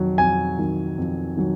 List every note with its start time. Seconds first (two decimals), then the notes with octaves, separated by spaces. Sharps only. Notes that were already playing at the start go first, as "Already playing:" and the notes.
Already playing: F2 D#3 F#3
0.18 F2 G#5
0.59 D#3 F#3
0.98 F2
1.37 D#3 F#3